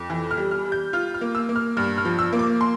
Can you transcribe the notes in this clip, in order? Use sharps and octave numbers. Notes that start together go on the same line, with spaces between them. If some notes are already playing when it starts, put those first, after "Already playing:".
Already playing: F2
E3
F6
G3
F6
G3
G6
F4 F6
F6
A#3
E6
A#3
F6
G2 F6
F6
F3
E6
A#3
D6
C6